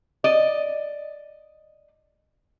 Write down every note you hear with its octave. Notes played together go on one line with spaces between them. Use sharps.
D5 D#5